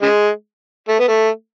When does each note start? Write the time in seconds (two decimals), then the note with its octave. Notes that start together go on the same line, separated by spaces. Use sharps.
0.02 C#3 G#3
0.89 A3
0.99 B3
1.08 A3